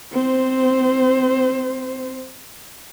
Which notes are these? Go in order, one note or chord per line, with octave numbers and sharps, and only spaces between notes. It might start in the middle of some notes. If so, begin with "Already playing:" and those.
C4 C5